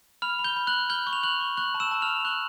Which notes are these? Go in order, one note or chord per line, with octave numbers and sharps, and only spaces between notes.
B5 F6 F7
B5
G6 G7
B5
F#6 F#7
B5
F6 G6 G7
C#6
F7
F6 F#6 F#7
C#6
C#6 F#6 F#7
A5
E6 E7
A5
F6 F7
C#6
C#6 F#6 F#7